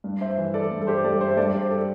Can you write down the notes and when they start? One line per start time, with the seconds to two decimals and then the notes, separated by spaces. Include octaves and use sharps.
0.04 G2
0.21 C5 E5
0.38 E3
0.54 A4 D5
0.72 G2
0.81 A4
0.87 G4 C5
1.04 G2 A4 D5
1.21 C5 E5
1.37 G2 A4 D5
1.54 G4 C5
1.70 A4 D5